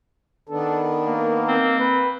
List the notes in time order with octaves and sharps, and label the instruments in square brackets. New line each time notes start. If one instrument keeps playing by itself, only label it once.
[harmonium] D#3 B3 D4 [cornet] A4
[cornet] A#3
[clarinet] C4
[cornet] B4